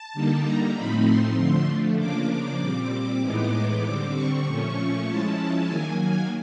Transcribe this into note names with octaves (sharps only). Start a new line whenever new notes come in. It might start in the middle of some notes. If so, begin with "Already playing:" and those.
Already playing: A5
D3 G3 A#3 D#4
A#5
A2 F3 A3 C4 D#4 B5
C6
D3 F3 A3
C#3 F3 A#3 D4 D6
D6
A#2 G3 C4
A2 E3 G#3 B3 D#4 D6
D3 G3 C4
C#6
A#2 F3 A3 C#4
F3 G#3 C#4 E4 A5
D#3 F#3 A#3 G#5
G#5